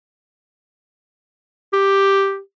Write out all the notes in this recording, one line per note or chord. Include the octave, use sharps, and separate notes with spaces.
G4